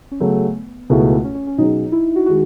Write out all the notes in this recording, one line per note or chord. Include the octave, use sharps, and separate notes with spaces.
C#4
C#3 F#3 A3 B3
C#2 B2 A3 E4 G#4
C#4
C#4
C#4
B2 F#3 C#4 D#4 G#4
E4
F#4
D#3 G#3 F#4